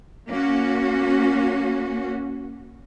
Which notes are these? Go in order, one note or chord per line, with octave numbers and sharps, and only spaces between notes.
A#3 C#4 F#4